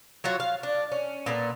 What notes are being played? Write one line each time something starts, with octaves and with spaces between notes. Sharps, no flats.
F#3 F4 F#4 C#5
F5
D4
C#4
A#2 B3 A4